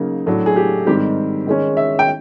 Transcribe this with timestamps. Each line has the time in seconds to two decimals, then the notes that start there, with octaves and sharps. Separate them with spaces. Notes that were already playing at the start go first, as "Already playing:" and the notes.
Already playing: C#3 F#3 A#3 D#4
0.26 A2 F#3 A3 D4
0.46 G#4
0.56 G4
0.87 G#2 D#3 G3 C4 G4
1.47 D#3 G#3 C#4
1.77 E5
1.99 G5